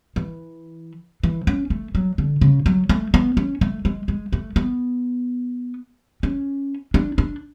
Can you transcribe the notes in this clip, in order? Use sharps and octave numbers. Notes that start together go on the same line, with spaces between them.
E3
E3
C#4
A3
F#3
D3
C#3
F#3
A3
B3
C#4
A3
G#3
G#3
A3
B3
C#4
D4
D4